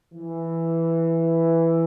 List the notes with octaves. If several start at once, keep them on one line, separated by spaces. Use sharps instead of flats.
E3